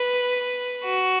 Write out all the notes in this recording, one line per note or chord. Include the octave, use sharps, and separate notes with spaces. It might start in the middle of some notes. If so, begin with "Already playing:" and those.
Already playing: B4
F#4